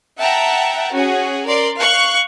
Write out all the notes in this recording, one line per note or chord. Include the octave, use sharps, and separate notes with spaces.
E5 F#5 G5 A5 A#5
C#4 F#4 G#4
A#4 D5 C6
F5 C#6 F#6